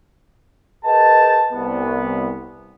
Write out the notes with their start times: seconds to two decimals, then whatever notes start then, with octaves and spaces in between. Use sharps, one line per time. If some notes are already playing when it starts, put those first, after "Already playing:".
0.85 G#4 A#4 B4 D#5 G5 A5
1.52 C2 B3